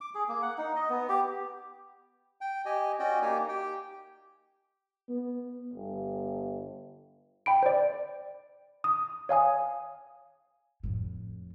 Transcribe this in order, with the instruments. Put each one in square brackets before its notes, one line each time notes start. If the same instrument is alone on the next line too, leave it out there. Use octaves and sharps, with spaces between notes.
[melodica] D6
G#4
A#3
F#5
D#4
D#5
B3
G4
[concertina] G5
G4 D#5 G#5
C#4 F#4 D5 D#5 G5
A#3 D#4 G4 G#5
G4 G5
[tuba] B3
G1
[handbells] G5 B5 D7
C5 D5
D#6
C#5 F5 G#5 D#6
[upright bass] F2 A2